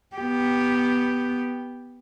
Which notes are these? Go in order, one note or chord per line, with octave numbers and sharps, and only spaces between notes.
B3 G4